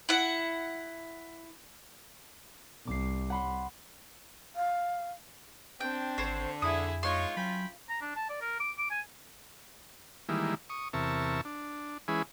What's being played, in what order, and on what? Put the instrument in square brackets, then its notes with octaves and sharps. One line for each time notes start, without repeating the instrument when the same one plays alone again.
[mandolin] E4 F#5
[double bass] C2 [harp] D6 C7
[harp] F#5 B5 C6
[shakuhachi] F5
[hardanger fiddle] C4 D4 [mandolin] G5
[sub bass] G#1 [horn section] D3 [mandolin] C5 C#5
[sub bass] F2 [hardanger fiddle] E4 G#4 [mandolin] D#6
[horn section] G#3 D#4 C#5 [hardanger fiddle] F4 [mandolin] C6
[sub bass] F#3 [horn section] C#4 G5 B5
[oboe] A#5
D4
A5
D5
A#4
D6
D6
G#5
[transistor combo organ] D#3 E3 G3 G#3 A#3 E4
C#6 D#6
E2 C3 A#4 E5 A5 C#6
D4
E3 G#3 C#4 E4 G#4 B4